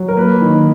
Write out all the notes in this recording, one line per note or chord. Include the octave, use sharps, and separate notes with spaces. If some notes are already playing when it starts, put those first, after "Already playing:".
Already playing: F#3
A#4
A#3 B4
D#3